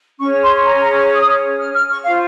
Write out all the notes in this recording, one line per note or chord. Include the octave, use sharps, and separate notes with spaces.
C#4 G#4 C#5 C#6
C6
A#5
A#5
C#6
D#6
F6
F6
C#6
F4 C5 F5